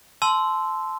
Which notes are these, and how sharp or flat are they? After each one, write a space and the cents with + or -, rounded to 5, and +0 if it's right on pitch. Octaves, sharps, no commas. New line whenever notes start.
A5 -20 C6 -10 E6 +0